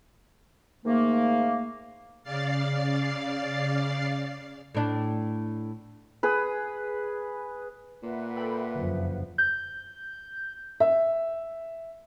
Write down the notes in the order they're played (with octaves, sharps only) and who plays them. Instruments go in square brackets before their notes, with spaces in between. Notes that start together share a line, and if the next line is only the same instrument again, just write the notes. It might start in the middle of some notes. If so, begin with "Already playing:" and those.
[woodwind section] G#2 D#3 A3 A#3
[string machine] C#3 D5 F5 A6 C7
[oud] A2 D4
[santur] G#4 B4
[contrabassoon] A#2 [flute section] B4 E5 F#5
[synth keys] A4 G5 B5
[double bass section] F#1 F2 F3 [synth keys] D3 F#3
[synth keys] G6
[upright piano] E5